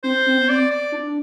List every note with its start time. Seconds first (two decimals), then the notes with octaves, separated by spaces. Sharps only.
0.03 C4 C5
0.26 C4
0.37 B3
0.49 C4 D5
0.70 D5
0.92 D4